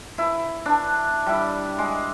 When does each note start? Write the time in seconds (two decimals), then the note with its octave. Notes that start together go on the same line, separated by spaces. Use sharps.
0.18 E4
0.66 D4
1.27 G3 E4
1.79 G#3